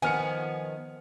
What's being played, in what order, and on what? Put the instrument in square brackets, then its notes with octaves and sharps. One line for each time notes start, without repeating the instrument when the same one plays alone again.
[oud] D#3 F3 B3 [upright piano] G#5 F6 C#7